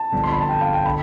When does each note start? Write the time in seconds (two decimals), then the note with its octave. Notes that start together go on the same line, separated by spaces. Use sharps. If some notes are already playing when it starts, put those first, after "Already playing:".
Already playing: A5
0.12 G1 G2 D3 F3
0.24 C6
0.32 B5
0.41 A5
0.49 G5
0.61 F5
0.73 G5
0.85 D3 B5